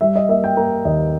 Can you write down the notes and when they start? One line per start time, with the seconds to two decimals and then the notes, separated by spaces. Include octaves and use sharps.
0.01 G3 E5
0.16 D#5
0.29 A#3 E5
0.44 G5
0.57 A#3 A#5
0.85 D#2 D#5